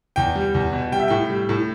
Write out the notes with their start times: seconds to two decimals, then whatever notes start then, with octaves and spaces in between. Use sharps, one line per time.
0.16 E2 G5
0.36 G3
0.54 E2
0.73 B2
0.92 G3 G5
0.99 E5
1.08 A2 G5
1.30 G3
1.49 A2